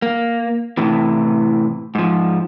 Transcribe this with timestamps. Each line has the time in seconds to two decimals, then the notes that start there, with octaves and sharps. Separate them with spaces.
0.02 A#3
0.77 A2 C3 E3
1.95 G#2 F3